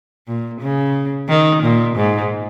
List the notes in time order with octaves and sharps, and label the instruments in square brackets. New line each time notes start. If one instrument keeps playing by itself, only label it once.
[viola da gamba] A#2
C#3
D#3
A#2
G#2